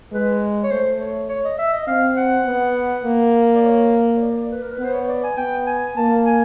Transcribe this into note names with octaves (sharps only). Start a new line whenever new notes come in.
G#3 B4
C#5
A3 C5
C#5
C#5
D#5
E5
D#5
C4 F5
F#5
B3
A#3
D5
C#5
C#5
D5
B4
A#4
B4
B3 C5
C#5
D5
G#5
B3 G5
G#5
A#3 A5
G#5